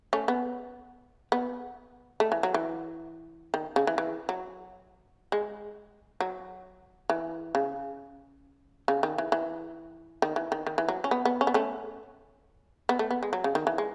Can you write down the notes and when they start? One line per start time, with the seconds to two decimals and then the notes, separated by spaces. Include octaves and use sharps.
0.13 A3 C#4
0.28 B3
1.32 B3
2.20 A3
2.32 E3
2.43 F#3
2.54 E3
3.54 D#3
3.76 C#3
3.87 E3
3.98 E3
4.29 F#3
5.32 G#3
6.20 F#3
7.10 E3
7.55 C#3
8.88 C#3
9.03 D#3
9.18 E3
9.32 E3
10.22 D#3
10.36 E3
10.52 D#3
10.67 D#3
10.78 E3
10.88 F#3
11.04 C#4
11.11 B3
11.25 B3
11.41 C#4
11.47 B3
11.54 A3 C#4
12.89 B3
12.99 A3
13.11 B3
13.23 G#3
13.33 F#3
13.44 C#3
13.55 D#3
13.67 E3
13.78 G#3